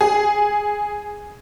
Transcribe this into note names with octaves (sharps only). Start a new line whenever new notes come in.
G#4